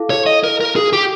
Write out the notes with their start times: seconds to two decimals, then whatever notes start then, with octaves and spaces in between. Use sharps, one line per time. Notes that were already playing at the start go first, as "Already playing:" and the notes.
Already playing: E4 A4 F5
0.10 C#5
0.26 D#5
0.44 A#4
0.60 A#4
0.76 G#4
0.93 G4